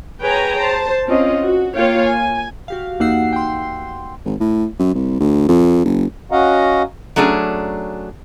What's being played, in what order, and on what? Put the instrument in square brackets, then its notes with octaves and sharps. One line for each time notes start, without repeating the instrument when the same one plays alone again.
[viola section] G#4 B4 C#5 G5 G#5 A#5
C5 A5
C4 C#4 F4 D#5
F#4
A#3 F4 C#5 F5 G5
G#5
[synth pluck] F#4 G4 F5
E2 A#3 D#4 F#5 E6 C7
G5 C6
[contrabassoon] G#1
A2
F#2
C2
D2
F2
F#1
[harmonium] C#4 F#4 D#5 F5 F#5 A#5
[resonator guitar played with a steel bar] F#3 A3 C#4 D4 G#4